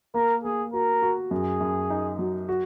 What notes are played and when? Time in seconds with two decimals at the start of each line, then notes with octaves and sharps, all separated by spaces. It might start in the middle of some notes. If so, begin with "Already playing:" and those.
0.14 A#3 A#4
0.44 A#3 G#4
0.73 F#4 A#4
1.02 F#4
1.31 F#2 G#4
1.60 F#2
1.90 D#4
2.19 F#3
2.49 F#4